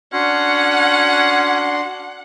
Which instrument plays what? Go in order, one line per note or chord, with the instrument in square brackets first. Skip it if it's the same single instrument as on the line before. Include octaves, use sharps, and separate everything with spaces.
[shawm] C#4 [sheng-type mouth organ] D4 F#4 C6 [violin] F#5